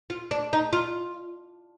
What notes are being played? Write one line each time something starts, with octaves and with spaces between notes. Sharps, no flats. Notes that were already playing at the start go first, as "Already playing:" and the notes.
F4
D4
D#4
F4